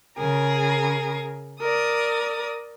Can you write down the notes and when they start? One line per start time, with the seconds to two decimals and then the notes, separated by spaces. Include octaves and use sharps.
0.16 C#3 G#4 A#4
1.60 A#4 D5 D#6